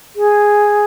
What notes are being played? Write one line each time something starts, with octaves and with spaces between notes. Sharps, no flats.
G#4